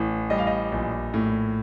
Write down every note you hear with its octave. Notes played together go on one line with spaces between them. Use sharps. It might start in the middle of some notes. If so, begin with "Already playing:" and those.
Already playing: A1 A2
G3 D#5
F5
D#5
A#1
A2